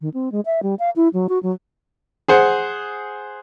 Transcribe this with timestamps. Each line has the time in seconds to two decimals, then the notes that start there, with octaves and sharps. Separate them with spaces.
0.01 D#3
0.14 C4
0.32 G#3
0.46 E5
0.63 G3
0.79 F5
0.96 E4
1.13 F#3
1.29 F#4
1.43 F#3
2.28 G#4 C5 F#5